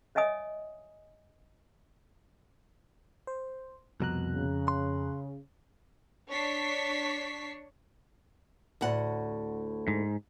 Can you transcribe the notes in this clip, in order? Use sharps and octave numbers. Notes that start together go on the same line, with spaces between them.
C#5 D#5 E5 G#5 D#6
C5
C2 F2 B2 A#5 F#6
C#3
C6
D4 C#5 C#6 B6 C7
D2 A2 F#5
G#2